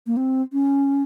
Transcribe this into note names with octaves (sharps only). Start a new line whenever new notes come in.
A#3
C4
C#4